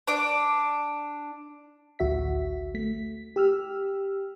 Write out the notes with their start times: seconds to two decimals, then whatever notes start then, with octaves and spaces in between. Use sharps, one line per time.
0.07 D4 D6
1.99 A1 D2 F#4 E5 B6
2.74 A3 B6
3.36 G4 E6 F6